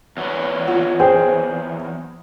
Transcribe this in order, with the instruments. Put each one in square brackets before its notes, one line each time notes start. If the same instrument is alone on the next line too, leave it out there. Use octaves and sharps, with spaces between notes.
[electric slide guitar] E2 F#3
[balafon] F4 F#5
[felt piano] G#4 C5 G5